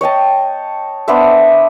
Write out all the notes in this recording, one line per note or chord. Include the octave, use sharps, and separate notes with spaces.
C#5 D#5 G5 A5
B3 D4 C5 E5